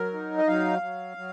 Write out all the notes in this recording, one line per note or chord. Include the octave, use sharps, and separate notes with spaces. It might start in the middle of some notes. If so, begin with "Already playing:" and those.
Already playing: F#3 A#4
D#4
D#5
F#3 F5
F#3
F#3